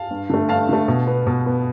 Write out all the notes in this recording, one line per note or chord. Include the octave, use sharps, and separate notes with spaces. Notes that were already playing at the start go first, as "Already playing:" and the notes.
Already playing: F5 A5
G2
D3 A3
G2 F5 A5
D3 A3
B2
B3
B2
B3